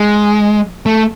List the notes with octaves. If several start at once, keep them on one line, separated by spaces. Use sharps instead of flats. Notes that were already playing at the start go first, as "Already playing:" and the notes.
Already playing: G#3
A3